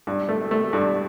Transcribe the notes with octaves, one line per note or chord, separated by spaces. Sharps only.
G2
A3
A3
G2